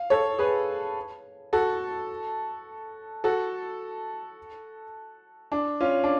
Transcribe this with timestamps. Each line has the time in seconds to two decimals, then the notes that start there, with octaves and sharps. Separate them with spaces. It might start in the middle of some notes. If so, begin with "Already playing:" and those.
Already playing: F5
0.10 A4 C#5
0.39 G#4 B4
1.53 F#4 A4
3.24 F#4 A4
5.52 D4
5.81 C#4 F4
6.04 D4